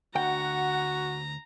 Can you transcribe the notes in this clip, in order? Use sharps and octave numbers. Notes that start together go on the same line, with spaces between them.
D2 F#4 F#5 G5 A#5